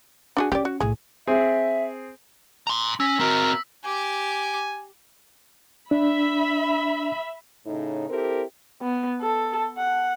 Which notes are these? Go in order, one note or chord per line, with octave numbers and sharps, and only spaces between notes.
D4 F#4 G#4
C#4 G4 D5
F#4
B1 A2 G#4
C4 G#4 E5
A#5 C6
C#4 E6 A#6 B6
C4 F#4 A#4
G4 G#5 D6
D4 E5 B5
A2 C#3 D#4
C4 E4 G4 A4 A#4
B3
A4
F#5